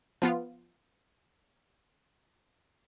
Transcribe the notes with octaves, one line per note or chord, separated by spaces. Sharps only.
F3 B3 F4